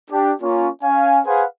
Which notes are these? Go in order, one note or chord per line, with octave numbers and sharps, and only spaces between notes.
D4 G4
A#3 C#4 F4
C#4 F5 G#5
G#4 B4 C5 F5 F#5 G#5